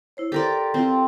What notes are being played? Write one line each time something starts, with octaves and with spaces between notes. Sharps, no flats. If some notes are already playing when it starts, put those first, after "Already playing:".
E4 C5 C#5
G4 A4 A#4 D5 C6
C4 F4